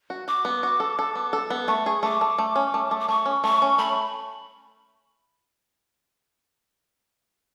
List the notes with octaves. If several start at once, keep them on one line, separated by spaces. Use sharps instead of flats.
F#4
F#4 D6
B3
F#4
A4
A4
B3
A4
B3
A3 C#6
G#4
A3 D6
A3
A3
C#4
A3
A3
D6
A3 C#6
C#4
A3 C#6
C#4
A3 B5